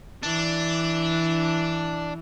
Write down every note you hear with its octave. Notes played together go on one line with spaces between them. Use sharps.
E3 D4